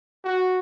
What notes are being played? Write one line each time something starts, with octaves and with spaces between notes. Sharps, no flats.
F#4